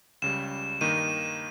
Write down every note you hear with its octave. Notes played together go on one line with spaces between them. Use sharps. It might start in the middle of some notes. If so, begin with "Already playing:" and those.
C#2 C#3 G3 E7
G2 D#3 A#3 D#4 D#7